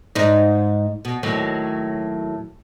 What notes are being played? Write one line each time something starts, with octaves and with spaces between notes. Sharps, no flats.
G#2 D#4
B2
D#2 A2 F#3